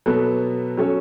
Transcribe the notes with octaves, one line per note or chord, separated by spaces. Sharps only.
B2 F#3 B3 A4
F#3 C#4 A4 C#5